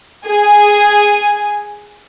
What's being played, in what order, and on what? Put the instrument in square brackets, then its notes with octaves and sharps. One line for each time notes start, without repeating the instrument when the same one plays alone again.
[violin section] G#4 G#5